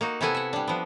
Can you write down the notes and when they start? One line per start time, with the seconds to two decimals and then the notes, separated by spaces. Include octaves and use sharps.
0.01 A#3 D#4 F#4
0.21 C3 B3 E4 A4 F#5 G#5
0.34 E5 F#5
0.53 G3 D4
0.68 F3 B3